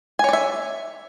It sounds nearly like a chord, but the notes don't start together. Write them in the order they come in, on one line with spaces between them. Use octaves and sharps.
G#5 C#5 D5 E5